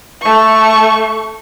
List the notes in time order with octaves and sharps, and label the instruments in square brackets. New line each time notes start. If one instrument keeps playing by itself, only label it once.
[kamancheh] A3 C#6